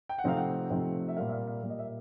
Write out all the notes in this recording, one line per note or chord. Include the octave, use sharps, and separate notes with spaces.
G5
F#5
C3 F3 A3 C4 D#4 F5
F#5
C3 F3 A3 C4 D#4
E5
A#2 G3 A#3 F5
E5
F5
F5
A#2 G3 A#3
D#5
E5